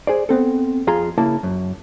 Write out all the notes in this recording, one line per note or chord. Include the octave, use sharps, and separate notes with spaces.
G#4 C5 D5
B3 C4 A4
F2 F4 G#4 A#5 C6
C#3 A#3 E4 A5
F#2